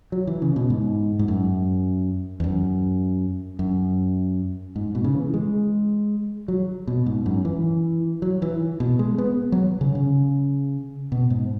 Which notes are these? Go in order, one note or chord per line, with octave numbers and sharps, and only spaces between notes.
F#3
E3
C#3
B2
G#2
G#2
F#2
E2
F#2
F#2
G#2
B2
C#3
E3
G#3
F#3
B2
G#2
F#2
E3
F#3
E3
B2
G#3
B3
F#3
C#3
C#3
B2
G#2